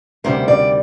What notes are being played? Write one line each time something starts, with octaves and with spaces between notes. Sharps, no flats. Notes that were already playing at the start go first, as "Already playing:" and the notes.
D2 C3 D#3 G3 C5
D5